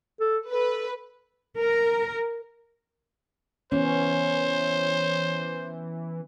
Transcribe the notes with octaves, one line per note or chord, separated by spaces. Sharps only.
A4
A4 B4
A#4
E3 B3 C#4 C5 C#5